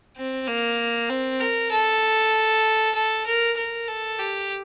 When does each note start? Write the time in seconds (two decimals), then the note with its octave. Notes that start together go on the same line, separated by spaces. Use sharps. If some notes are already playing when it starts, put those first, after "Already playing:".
0.17 C4
0.48 A#3
1.10 C4
1.40 A#4
1.71 A4
2.95 A4
3.26 A#4
3.57 A#4
3.88 A4
4.19 G4